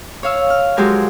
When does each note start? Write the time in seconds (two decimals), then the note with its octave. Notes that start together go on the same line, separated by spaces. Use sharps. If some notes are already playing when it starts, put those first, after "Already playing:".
0.23 C#5 F5 E6
0.50 F6
0.77 F3 F#3 G#3 G4 A#4 G#5